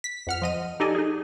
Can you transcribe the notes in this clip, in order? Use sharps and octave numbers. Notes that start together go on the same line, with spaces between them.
B6
F2 F#5 F6
F3 D#5 D#7
D#4 G4 A4 D5 D#5 G#5
D#4 G#4